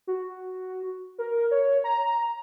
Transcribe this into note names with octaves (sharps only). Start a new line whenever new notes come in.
F#4
A#4
C#5
A#5